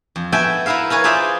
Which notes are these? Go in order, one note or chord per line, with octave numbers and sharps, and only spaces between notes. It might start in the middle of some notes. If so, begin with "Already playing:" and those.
F2
B3 F#4 A4 E5 G5 G#5
E4 A#4 B4 E5 F5
A#4 B4 C#5 G#5
F4 G#4 B4 C5 D5 E5